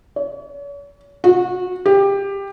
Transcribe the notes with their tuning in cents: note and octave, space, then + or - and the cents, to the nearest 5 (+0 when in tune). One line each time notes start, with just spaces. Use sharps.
C#5 +40
F#4 -25
G4 +15